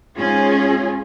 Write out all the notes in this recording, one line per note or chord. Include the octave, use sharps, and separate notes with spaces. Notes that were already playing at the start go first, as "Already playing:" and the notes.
G#2 C#4 F4 G#4